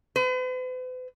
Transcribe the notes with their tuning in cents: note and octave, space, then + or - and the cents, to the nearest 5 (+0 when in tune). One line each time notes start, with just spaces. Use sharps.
B4 +45